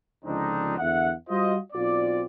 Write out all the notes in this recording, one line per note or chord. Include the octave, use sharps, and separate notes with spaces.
C#2 D3 F3 C4 D4 D#4
E2 D3 E5 F#5
G3 F4 F#4 C5 D#5
B1 C4 F4 D5